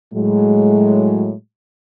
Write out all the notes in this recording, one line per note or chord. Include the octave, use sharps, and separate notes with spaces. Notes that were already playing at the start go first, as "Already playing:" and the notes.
A2 F#3 G#3